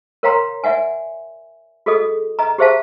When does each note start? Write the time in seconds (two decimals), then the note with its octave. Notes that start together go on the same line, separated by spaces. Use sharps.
0.23 A#4 C#5 F5 G5 A#5 C6
0.64 D5 E5 F#5 G#5
1.86 F#4 G#4 A4 D#5 D#6
2.39 D#5 A#5
2.58 G4 G#4 C5 E5 F5 A5